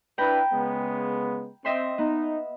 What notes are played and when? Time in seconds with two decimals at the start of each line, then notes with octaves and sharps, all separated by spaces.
0.18 D4 E4 B4 G5 A#5 B5
0.52 C#3 G#3 B3
1.65 C4 D#5 E5 C6
1.98 B3 D#4